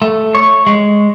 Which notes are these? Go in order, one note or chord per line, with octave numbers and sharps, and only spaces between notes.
A3
C#5
G#3